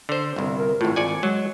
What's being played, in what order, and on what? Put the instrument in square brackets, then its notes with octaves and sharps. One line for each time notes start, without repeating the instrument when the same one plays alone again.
[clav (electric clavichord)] D3 C5
G1 C2
[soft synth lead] A#4
[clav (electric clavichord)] G#1 A2 [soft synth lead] F4
[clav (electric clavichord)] G#1 D5 G#5 [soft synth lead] C#7
[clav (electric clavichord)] F#3 [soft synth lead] G#3